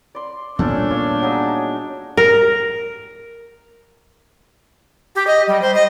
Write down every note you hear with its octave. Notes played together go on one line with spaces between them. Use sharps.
D5 C6
A#2 G3 A3 B3 C#4 D4 A4
C#5 D5 F5
F#3 D#4 G#4
A#4
G4
D#5
G3
C5
D#5